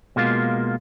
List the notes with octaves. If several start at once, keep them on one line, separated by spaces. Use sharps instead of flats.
B2 G#3 A#3 F4